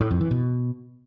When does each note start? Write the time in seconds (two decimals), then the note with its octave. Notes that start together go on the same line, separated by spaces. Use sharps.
0.01 A2
0.11 F2
0.21 E3
0.31 B2